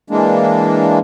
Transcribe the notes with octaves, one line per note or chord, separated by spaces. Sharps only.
E3 G#3 A#3 D4